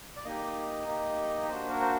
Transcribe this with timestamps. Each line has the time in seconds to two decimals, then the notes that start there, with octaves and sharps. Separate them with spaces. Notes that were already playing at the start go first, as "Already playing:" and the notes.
0.16 D5
0.25 A#3 D#4 G4 D#5
0.86 A#3 D#4 G4
1.49 A#3 D4 F#4 C5
1.70 A#4
1.81 C5